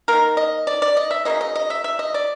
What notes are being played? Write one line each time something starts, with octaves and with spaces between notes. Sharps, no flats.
D#3 F#3 A#3 A#4
D#5
D5
D5
D#5
E5
C#3 F#3 A#3 D#5
D#5
D#5
E5
E5
D#5
D5